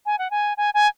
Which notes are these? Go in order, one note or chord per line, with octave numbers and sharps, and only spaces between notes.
G#5
F#5
G#5
G#5
G#5